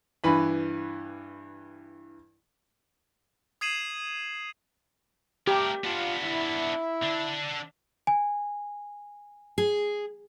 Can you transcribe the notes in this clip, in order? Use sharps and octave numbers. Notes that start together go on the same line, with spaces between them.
G2 E3 B4 B5
D#6 G#6 C7 D#7 E7 F#7
A3 G4 A#4
B3 D4 F4
E4
D3 D4
G#5
G#4